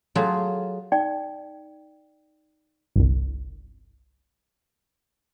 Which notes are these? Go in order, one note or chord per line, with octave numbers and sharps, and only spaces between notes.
F#3 A3 F4 G#4
D#4 D5 G5
G1 C2